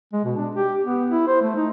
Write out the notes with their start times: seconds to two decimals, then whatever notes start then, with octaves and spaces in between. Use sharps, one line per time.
0.13 G#3
0.24 B2
0.36 D4
0.55 G4
0.84 B3
1.10 E4
1.27 C5
1.42 A3
1.56 D#4